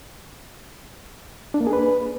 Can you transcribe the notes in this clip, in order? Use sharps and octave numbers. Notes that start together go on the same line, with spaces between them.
D4
A#3
G#4
B4